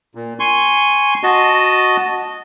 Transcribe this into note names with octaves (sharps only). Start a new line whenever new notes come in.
A#2
G#5 C6 C#6
F#4 D#5 A5